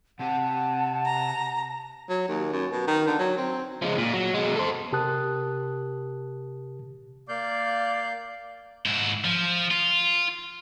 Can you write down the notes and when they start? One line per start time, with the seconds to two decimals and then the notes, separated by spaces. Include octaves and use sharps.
0.19 C3 C4 G4 F#5 A5
1.06 A#5
2.09 F#3
2.28 D#2
2.52 F#2
2.72 B2
2.88 D#3
3.07 D3
3.19 F#3
3.37 C4
3.82 F3 G#3
3.98 A#2
4.13 F#3
4.34 B2 G#3
4.56 A4 C5
4.92 C3 G4 A#4 A5 D#6 F#6
7.29 A#3 D5 F5 G6
8.86 G#2 E4
9.25 F3
9.71 F4